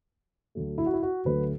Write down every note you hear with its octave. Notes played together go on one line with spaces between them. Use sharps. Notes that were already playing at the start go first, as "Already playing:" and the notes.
D2 D3 F#3 A3
E4
F#4
E4
F#4
D2 D3 F#3 A3 B4